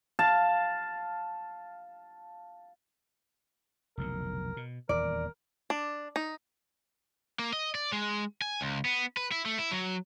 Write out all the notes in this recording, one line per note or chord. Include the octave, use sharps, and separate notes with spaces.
F5 A5
F1 B1 D3 A#4
B2
D#1 E2 A#4 D5
D4
D#4
A#3
D#5
D5
G#3
G#5
C#2
B3
B4
E4
A3
E4
F#3